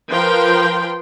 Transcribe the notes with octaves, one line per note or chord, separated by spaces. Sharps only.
F3 A#4 B4 G5 C6